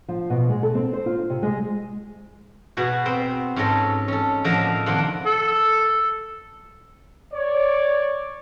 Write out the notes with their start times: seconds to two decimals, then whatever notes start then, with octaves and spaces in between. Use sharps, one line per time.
0.08 F3
0.30 B2
0.49 G#3
0.63 A4
0.75 C4
0.93 C5
1.06 F4
1.30 C3
1.43 G#3
2.77 B2 F#4 G#4
3.05 B3 C4 C5
3.56 G#2 C#4 D#4 A4 D#5
4.08 C#4 A4
4.44 A2 D3 F3 A#3 D#5 F5
4.86 C3 D#3 A#3 D4 F#5 C6
5.26 A4
7.34 C#5 D5